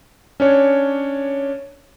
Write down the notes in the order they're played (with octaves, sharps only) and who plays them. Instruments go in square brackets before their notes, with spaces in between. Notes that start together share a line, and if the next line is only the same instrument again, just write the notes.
[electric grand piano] C#4 D4 C#5